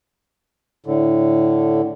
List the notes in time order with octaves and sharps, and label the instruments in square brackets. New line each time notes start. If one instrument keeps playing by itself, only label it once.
[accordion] A2 D3